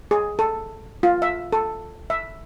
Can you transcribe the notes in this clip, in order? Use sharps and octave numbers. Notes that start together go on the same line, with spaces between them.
G#4
A4
F4
E5
A4
E5